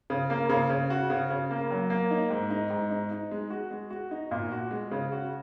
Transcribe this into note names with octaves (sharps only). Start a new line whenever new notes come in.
C#3
A#3
C#3
C#3
F#4
C#3
C#3
A#3
F#3
A#3
D#4
G#2
D#4
G#2
D#4
D#4
G#3
F#4
G#3
F#4
D#4
A#2
F#4
G#3
C#3
F#4